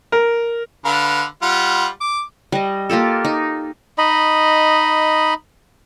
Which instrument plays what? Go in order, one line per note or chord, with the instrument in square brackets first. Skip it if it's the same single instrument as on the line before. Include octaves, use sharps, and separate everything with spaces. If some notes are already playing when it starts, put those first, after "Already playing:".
[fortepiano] A#4
[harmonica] D3 B4 F5
G3 F4 F#5
D6
[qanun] G3 D#5
A#3 F4 G4 A4
D#4
[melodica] D#4 D#5 B5